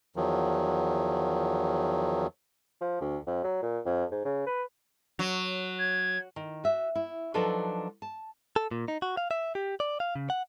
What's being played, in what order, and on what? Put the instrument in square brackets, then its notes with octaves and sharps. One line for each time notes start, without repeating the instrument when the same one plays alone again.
[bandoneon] E2 D#3 F3 F#3
[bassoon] F3
D2
F2
F#3
A#2
F2
G#2
C#3
B4
[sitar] F#3
[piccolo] G#6
[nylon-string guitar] D#3
F#4 E5
E4
F3 F#3 D4 D#4 A4 B4
A5
[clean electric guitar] A4
A#2
D#4
F#4
F5
E5
G4
D5
F5
C#3
F#5